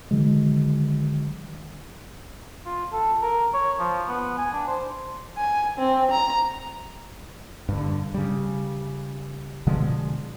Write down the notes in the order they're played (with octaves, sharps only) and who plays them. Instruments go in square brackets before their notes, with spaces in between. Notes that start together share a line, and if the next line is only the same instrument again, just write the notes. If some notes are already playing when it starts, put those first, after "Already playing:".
[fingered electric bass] D3 D#3 F#3 G#3
[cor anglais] F4
A4
A#4
C#5
F3
B3
G#5
D4
C5
[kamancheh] G#5
C4
A#5
[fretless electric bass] G2 D3
C#3 G3
B2 D3 F3 G#3